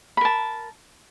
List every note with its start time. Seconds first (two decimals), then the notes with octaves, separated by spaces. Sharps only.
0.17 B5
0.21 A#4
0.25 A5